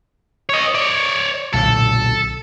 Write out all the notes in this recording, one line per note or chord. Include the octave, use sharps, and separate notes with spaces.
C#5 D#5
C#5 D5
B1 A#2 D3 A4